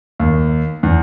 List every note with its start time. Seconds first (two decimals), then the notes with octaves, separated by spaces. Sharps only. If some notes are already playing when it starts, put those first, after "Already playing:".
0.20 D#2
0.83 E2